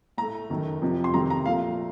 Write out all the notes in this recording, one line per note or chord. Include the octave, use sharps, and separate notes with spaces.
A2 A3 A#5
F#2 D#3 A3
F2 C3 F3
C6
C3 D#3 F#3 A3 A#5
A#5
A#2 F3 A3 F5